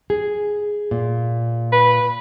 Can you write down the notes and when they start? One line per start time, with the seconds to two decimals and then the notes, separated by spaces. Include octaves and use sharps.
0.10 G#4
0.91 A#2
1.72 B4